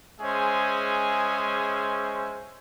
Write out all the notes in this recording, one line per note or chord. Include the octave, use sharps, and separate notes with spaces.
G#3 C#4 G#4 C5 E5 G#5